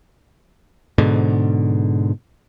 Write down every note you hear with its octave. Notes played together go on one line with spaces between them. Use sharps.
G#2 B2 D3